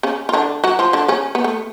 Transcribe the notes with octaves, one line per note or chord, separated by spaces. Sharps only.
C#3 C#4
F4
D3 D4
F#3 F#4
F3 F4
D3 D4
C#3 C#4
B3
A3